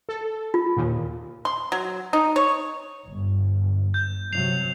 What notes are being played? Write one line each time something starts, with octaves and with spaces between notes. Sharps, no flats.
A4
F4
D#2 A#2
C6
F#3
D#4
C#5
G1
G6
C3 F#3 C7 F7